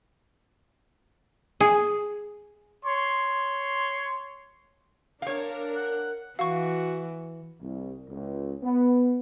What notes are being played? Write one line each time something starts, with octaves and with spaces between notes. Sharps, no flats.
G#4
C#5 C6
D4 A#4 C#5 F5
F#5
E3 F#4 F5 C#6
C2
C#2
B3